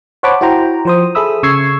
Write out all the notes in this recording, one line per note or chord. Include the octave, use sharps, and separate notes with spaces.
C5 C#5 F#5 A5 B5 D6
E4 F#4 C5 G5 A#5
F3 C5 D#6
G#4 A4 E5 B5 D#6 E6
C#3 C#6 E6 G#6 C7